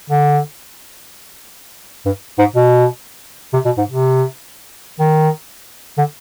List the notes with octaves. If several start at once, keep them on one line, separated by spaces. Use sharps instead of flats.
D3
G2
G#2
B2
C3
B2
G#2
C3
D#3
D3